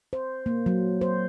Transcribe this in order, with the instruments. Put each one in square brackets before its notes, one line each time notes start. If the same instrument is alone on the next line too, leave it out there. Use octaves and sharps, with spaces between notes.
[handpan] C5
A#3
F#3
C5